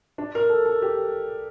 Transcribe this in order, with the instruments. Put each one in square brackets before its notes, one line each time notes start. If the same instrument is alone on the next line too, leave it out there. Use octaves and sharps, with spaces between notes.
[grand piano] D4
A#4
A4
A4
G4